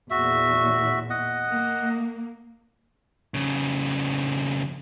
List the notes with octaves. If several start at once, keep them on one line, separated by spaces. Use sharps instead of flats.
E2 A#2 F#4 E5
D#5 F#5
A#3
F2 C#3